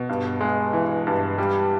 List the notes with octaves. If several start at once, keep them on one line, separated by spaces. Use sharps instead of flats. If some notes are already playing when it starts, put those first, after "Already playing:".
Already playing: B2
G2
G#3
E3
G2
G3